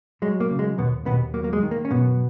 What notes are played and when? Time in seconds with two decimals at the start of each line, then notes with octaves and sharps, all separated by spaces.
0.22 F#3 G#3
0.40 A#3
0.51 C#3
0.59 G#3
0.78 D#2 B2 B3
1.06 D#2 B2 B3
1.34 F#3 A#3
1.44 A#3
1.53 G#3
1.63 D#3
1.71 A#3
1.85 C#4
1.90 F#2 B2 B3